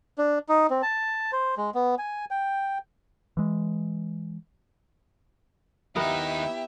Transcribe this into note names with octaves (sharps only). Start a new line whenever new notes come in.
D4
D#4
C4
A5
C5
G#3
B3
G#5
G5
E3 G#3
D#2 B3 D#4 E4 G4 A#4 E5 F#5